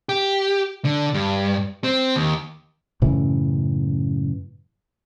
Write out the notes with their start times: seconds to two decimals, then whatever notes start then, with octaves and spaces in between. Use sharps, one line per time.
0.09 G4
0.85 D3
1.14 G2
1.84 C4
2.16 D#2
3.02 F#2 A2 C#3 E3